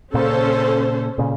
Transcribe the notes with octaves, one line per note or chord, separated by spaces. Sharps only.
A#2 C#3 C#4 A4 C5
A#2 C#3